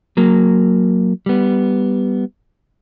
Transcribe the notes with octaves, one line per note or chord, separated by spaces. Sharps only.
F#3 A#3
G3 B3